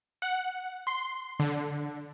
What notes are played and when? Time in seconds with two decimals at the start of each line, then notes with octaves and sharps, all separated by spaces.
0.22 F#5
0.87 C6
1.40 D3